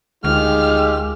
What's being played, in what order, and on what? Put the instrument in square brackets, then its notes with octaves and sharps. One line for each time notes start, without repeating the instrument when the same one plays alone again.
[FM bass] D2 [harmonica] D#3 F4 G4 [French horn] G#3 [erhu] F6